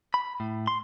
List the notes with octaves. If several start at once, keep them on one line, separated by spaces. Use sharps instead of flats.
B5
A2
C6